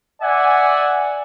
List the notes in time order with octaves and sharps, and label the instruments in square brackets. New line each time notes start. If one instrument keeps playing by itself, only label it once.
[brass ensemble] D5 E5 F#5 G#5